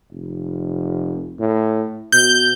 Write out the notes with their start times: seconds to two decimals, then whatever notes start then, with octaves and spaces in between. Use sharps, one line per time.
0.11 F1
1.39 A2
2.12 B2 G6